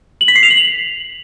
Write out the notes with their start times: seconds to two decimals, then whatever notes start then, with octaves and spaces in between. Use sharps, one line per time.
0.21 F#7
0.28 B6
0.36 C7
0.43 F7
0.50 F#7